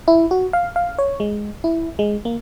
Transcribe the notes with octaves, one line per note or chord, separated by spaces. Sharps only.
E4
F#4
F5
F5
C#5
G#3
E4
G#3
A#3